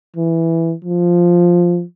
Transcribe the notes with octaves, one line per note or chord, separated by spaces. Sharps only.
E3
F3